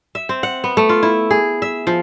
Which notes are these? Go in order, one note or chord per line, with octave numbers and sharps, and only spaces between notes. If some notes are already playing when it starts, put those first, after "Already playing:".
E5
C4
F#5
B3
A3
F4
E4
G#4
E5
F3